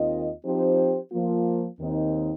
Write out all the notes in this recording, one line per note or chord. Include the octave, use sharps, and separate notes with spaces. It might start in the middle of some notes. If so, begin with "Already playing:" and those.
Already playing: D#2 D#3 C4 F4 D#5
F3 C4 D#4 G4 C5
F3 A#3 F4
D#2 D#3 C4 D#4